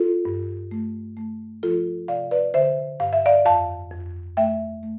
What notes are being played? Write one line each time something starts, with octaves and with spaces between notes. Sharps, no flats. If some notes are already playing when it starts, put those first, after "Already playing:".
Already playing: F4 A4
G2
A3
A3
F3 F4 A4
C3 D5 F5
B4 D5
D3 C5 E5
G2 F5
E5
D5 F5
F2 F5 A5
F2
A3 E5 G5
A3